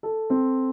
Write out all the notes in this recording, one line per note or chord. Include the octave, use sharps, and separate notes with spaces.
A4
C4